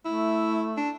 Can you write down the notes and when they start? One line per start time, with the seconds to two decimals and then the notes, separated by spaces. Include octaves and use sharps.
0.05 A3 E4
0.77 D4